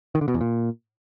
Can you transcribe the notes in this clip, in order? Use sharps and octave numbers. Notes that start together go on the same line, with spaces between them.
D#3
D3
B2
E2
A#2